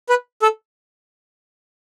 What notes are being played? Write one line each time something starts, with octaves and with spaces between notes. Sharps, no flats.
B4
A4